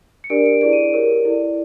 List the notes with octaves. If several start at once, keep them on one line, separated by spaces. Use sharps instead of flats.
C#7
D4 G4 A#4 D5 D7
D7
E4 G#4 B4 D5 D7
D#7
G4 A#4 C#5
E4 A4 D5